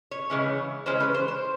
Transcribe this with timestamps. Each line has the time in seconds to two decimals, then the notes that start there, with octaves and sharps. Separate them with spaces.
0.11 C#5
0.30 C#3 E3 G#3 C#4
0.86 C#3 E3 G#3 C#4 C5
1.00 B4
1.14 C5
1.28 C5